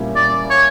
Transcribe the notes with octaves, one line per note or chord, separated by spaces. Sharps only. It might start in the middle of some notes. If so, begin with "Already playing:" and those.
Already playing: A#2 G3 A#3 C#4 E4
D5
C#5